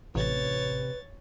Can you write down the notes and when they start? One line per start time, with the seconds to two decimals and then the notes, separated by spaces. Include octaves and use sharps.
0.15 A1 C3 B4 C#5 A6